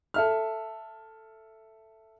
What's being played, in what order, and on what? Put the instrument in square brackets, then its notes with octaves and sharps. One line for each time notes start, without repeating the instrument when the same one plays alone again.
[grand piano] A4 E5 F6